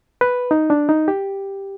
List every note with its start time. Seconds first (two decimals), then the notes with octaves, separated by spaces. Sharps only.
0.21 B4
0.51 D#4
0.70 D4
0.89 D#4
1.08 G4